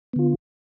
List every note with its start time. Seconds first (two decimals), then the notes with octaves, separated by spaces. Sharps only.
0.13 B3
0.16 D3
0.19 F4